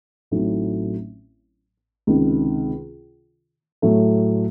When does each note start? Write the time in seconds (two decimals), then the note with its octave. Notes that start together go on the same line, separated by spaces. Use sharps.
0.31 A1 A2 F#3 C4 D#4
2.07 C#2 C3 D#3
3.82 A2 F#3 A3